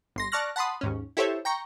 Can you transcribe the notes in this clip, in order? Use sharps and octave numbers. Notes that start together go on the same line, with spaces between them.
G1 C6 A#6
D5 A5 C#6 F6 F#6 A#6
F#5 A5 B5 C6 D#6
D#2 G#2 C#4
E4 G4 A4 C5 C#5 E5
G5 A#5 C#6